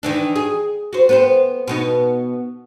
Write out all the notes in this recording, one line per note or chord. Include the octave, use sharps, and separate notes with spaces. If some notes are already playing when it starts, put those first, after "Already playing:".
D#3 E3 D4
G#4
F#4 C5
B3 B4 C5
B2 B3 D#4